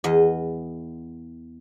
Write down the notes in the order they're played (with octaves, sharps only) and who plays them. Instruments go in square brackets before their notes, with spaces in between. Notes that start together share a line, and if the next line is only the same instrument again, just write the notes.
[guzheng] E2 D#5